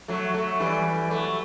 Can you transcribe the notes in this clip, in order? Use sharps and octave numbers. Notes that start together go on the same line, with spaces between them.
F#3 A3
F#3 A3
E3 G3
F#3 A3